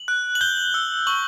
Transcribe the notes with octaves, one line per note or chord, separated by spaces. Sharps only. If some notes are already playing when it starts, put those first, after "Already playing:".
Already playing: F#7
F#6
F#7
G6 G7
E6
C#6 F#7